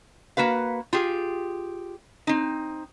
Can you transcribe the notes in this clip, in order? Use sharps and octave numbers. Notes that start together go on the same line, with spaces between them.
A#3 F#4 B4 F5
F4 G4 G#4
C4 D#4